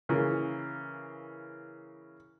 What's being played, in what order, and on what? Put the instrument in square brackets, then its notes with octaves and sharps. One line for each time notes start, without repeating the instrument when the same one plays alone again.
[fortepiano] C#3 E3 A#3